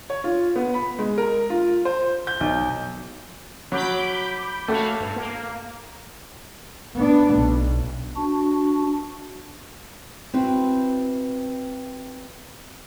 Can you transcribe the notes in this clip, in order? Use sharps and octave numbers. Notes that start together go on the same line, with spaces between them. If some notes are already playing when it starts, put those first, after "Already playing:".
C#5
F4
B3
B5
G#3
A#4
F4
C5
G6
B1
F#3 B5 D6 G6
A3 F#4 C#5 F5
G2
A#3
B3 D4
B1
D4 F#4
C4 E4 F#4 B4